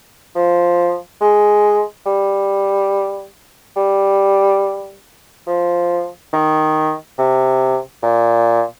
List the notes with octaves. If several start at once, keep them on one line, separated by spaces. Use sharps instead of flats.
F3
G#3
G3
G3
F3
D#3
C3
A#2